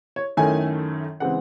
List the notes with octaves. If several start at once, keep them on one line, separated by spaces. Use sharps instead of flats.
C#5
F#2 D#3 A3 C#4 E4 G#5
C#3 E3 G#3 C4 F#5